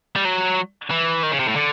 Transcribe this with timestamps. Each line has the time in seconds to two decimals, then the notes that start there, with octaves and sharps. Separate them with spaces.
0.16 G3
0.25 F#3
0.91 E3
1.23 D#3
1.32 C#3
1.39 C3
1.48 A2
1.56 D3